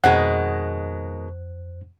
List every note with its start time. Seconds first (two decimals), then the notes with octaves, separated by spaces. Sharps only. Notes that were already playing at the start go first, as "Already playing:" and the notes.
0.04 F2 B2 D#3 G#3 C5 F#5 F#6